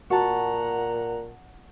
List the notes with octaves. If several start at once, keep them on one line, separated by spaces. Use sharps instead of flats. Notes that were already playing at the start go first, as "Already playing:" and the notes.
A#2 F#4 F#5 A5 A#5 C#6